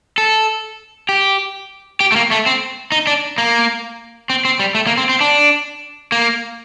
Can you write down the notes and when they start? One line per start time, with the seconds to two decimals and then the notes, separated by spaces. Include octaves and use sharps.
0.18 A4
1.09 G4
2.00 G4
2.12 A3
2.16 A#3
2.31 A3
2.46 C4
2.92 D#4
3.07 D4
3.38 A#3
4.30 C4
4.45 C4
4.60 G3
4.75 A3
4.87 A#3
4.97 C4
5.09 C4
5.21 D4
6.12 A#3